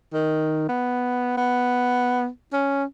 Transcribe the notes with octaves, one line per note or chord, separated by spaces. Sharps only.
D#3
B3
B3
C#4